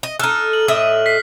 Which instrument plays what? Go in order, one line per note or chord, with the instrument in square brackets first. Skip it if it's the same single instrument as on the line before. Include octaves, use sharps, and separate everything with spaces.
[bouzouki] D#5
[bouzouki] D#4 A4 [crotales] F6 F#6
[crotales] F#7
[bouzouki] A2 D#5 E5
[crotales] B6 C7